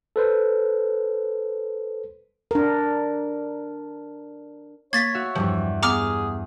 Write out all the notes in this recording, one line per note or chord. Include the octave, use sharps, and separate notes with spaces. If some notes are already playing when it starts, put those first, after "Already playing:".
A4 B4 C5
D4 A#4
A#3 C#5 G#6 A6 B6
F#4 E5 F5
E2 G2 F3 G3
B3 G#4 A#5 D6 F6